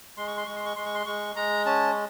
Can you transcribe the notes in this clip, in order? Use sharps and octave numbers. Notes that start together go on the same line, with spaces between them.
G#3 C6
C#6
C6
G#3 C#6
C6
C#6
G#3 C6
C#6
C6
G#3 C#6
G#3 A#5
C#4 A5